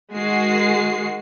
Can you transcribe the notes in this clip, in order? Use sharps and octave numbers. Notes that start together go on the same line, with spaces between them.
D#3 G#3 F#4 C7